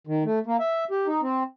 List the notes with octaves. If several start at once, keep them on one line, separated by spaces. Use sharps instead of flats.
D#3
A3
A#3
E5
G4
D#4
C4